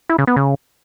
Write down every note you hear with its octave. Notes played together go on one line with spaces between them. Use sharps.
E4
C#3
B3
C#3